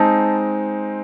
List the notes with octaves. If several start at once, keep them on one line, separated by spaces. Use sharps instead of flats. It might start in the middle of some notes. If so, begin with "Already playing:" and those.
Already playing: G#3 C4 D#4 A5